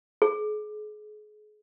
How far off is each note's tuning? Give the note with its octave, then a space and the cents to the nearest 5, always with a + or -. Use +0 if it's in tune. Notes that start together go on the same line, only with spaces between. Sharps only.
G#4 +35